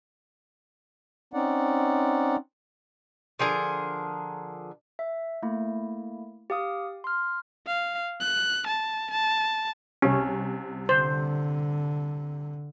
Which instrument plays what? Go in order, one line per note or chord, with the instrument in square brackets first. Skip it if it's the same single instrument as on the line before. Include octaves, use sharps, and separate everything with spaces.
[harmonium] C4 C#4 D#4 D5 F#5
[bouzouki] D3 F3 G#4 A#4
[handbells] E5
A3 A#3 E4
G4 F5 D#6
C6 F6
[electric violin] F5
F#6
A5
A5
[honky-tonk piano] C2 C3 [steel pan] C#4
[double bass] D3 [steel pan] C5